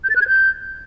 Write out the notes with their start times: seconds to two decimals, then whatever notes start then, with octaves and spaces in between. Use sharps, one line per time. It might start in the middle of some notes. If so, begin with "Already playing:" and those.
0.04 G6
0.10 A6
0.16 F#6
0.22 G#6
0.27 G6